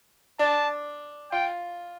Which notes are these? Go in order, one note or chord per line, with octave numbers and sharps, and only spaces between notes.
D4 A5
F4 G5